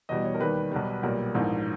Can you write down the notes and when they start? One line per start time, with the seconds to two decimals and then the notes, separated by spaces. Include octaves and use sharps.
0.09 E2 B2 G3 D#5
0.24 C#5
0.35 A#4
0.40 D#2 D#3 G3 B4
0.72 B1 B2 G3
1.03 B1 A#2 G3 A#4
1.35 A#1 G#2 E3